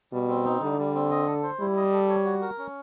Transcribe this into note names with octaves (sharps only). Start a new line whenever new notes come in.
B2 G3
C4
D#4
D3 G3
G3
C4
D#5
A4
C5
G3 E4
D#5
A4
C#5
F#4
A#4
C#4